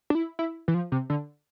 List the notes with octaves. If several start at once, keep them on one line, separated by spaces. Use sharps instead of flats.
D4
E4
E4
E3
F3
C3
D3